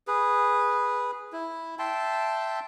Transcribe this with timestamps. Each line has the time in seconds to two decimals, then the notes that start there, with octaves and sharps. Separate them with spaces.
0.07 G#4 B4
1.33 E4
1.79 E5 G5 A5 C6